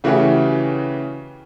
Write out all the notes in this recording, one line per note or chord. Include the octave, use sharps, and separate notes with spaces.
C#3 E3 A3 F#4 G4